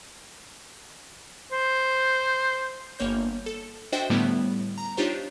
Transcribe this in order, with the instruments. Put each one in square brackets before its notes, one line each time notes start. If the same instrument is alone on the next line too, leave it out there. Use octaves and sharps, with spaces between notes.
[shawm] C5
[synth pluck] G1 A#3 C#5 G6
A4
D4 F#4 C5 D#5 E5 G5
A2 D3 G3 A3 B3 E4
A#5
D4 D#4 F4 G4 C5 C#5